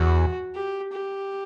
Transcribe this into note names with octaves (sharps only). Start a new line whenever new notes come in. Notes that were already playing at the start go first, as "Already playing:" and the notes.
Already playing: E2 F#4
G4
G4